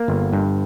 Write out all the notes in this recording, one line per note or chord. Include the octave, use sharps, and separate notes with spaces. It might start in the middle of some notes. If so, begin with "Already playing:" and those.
Already playing: A#3
G1
G2